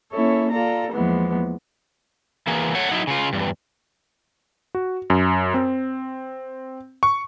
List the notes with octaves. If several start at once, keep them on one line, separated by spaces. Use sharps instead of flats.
A#3 C#4 E4 A4 C#5
F4 A4 D5 A#5
E2 E3 F3 G#3 A#3 B3
E3 A#3 B3 G#4
A3 C#5 F#5
F#3 D#4 E4
C#3 F4
E2 G2
F#4
F#2
C4
C#6